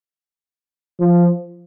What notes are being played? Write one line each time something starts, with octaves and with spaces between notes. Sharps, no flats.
F3